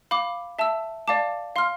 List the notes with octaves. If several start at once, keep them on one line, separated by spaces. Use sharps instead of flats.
F5 B5 D6
E5 A5 E6
D5 F5 A5 D6
F5 C6 F6